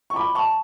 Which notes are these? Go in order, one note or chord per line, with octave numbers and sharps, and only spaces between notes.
C#6
B5 D6
A5 C#6